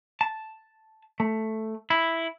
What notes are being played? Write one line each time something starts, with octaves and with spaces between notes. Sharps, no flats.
A5
A3
E4